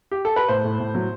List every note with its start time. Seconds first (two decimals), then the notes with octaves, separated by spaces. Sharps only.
0.11 G4
0.25 A4
0.36 B4
0.49 A2 C5
0.64 A2
0.80 A2
0.95 F#3